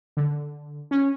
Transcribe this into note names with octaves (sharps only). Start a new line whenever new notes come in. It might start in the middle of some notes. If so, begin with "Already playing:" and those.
D3
C#4